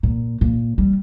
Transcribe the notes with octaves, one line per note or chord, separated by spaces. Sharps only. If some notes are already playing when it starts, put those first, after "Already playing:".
A#2
A#2
G3